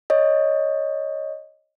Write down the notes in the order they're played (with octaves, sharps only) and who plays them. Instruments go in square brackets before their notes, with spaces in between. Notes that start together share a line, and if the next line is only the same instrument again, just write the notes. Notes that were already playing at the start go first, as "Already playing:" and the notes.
[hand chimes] C#5 D#5